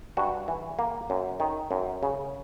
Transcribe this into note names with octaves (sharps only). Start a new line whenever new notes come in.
G2 F#4
E3
A#3
F#2
D#3
F#2
C#3